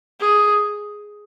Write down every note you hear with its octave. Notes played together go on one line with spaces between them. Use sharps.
G#4